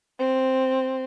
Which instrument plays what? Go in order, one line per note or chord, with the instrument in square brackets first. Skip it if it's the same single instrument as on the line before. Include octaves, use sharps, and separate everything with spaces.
[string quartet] C4